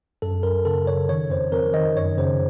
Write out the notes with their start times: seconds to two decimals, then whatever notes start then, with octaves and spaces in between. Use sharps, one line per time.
0.22 F#2 A4
0.43 F#2 A#4
0.65 C#3 A4
0.87 C#3 C#5
1.09 D#3 C#5
1.30 F2 C5
1.52 F2 A#4
1.74 D#3 D#5
1.96 F#2 C#5
2.18 C#3 C5